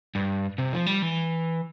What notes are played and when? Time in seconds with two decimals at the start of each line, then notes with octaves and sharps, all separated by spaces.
0.15 G2
0.58 C3
0.73 F3
0.86 G3
1.02 E3